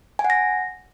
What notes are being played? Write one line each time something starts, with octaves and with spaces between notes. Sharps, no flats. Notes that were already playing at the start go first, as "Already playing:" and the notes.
G#5
F#5
A#6